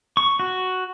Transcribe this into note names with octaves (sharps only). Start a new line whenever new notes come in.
C#6
F#4